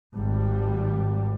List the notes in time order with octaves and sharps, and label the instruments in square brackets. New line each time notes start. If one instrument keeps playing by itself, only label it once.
[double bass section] G#1 G3